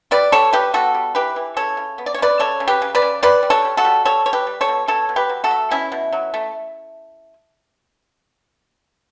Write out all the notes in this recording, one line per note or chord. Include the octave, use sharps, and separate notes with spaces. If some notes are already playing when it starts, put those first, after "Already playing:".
G3 B4 D5
G3 A4 C#5
G3 G4 B4
B3 F#4 A4
G3
E3 G4 B4
E3
C#3 A4 C#5
C#3
B3
D5
C#5
C#3 B4 D5
C#3 A4 C#5
C#3
G4 B4
C#3
B4 D5
C#3
G3 B4 D5
G3
A4 C#5
G3
F#4 A4
G3
G3 A4 C#5
G3 C#5
G4 B4
G3
A4 C#5
B2
B2 A4 C#5
B2
G4 B4
F#3
F#4 A4
A3
B2 C#4 E4
B2
F#3
A3